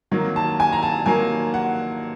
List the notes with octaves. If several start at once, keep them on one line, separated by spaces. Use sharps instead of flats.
D#3 F#3 A#3
A5
G#5
A#5
A5
D#3 F#3 A#3 G#5
F#5